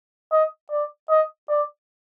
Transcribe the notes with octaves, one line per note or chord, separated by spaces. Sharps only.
D#5
D5
D#5
D5